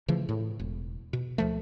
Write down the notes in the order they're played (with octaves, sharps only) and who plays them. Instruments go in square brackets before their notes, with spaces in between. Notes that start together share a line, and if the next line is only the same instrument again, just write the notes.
[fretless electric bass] C#3 E3 F3 A3
A2
E1
B2
D2 F3 A3